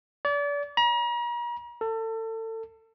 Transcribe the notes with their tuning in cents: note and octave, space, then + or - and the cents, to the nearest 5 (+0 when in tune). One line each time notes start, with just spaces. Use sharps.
D5 -35
A#5 +40
A4 +30